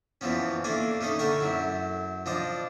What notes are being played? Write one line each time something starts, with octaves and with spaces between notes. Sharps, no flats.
E2 E3 F3 B3 C#4
A3 A#3 D4 G#5
A3 C#4 D#4 A4 D#5
D3 A3 A#4 G5 A#5 C#6
F#2 F#3 E4
F3 D4 D#5